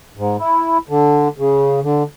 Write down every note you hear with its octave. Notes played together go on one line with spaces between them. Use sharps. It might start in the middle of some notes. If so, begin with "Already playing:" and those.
G#2
E4
D3
C#3
D3